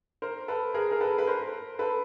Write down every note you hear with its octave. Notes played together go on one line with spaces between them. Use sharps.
A#4 C5
A4 B4
G#4 A#4
A#4
A4 B4
B4
A#4 C5
A4 B4